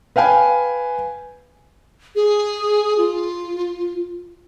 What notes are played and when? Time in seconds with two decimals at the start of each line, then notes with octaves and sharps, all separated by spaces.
0.16 B4 F5 G5 G#5
2.15 G#4
2.98 F4